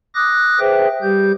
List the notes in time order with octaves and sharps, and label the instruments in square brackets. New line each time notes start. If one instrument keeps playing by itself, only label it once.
[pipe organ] D6 D#6 F#6 A#6
G#4 B4 C5 E5 G5
G3 G4 G6